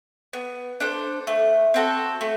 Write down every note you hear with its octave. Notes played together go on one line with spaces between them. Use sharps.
B3
D4 A4 C5
A3
C4 F#4 A4
A3